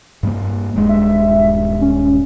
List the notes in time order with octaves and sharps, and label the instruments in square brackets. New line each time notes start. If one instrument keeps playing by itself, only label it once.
[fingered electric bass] G2 G3 A#3
D#1 G2 G#3
[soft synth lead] E5
C#4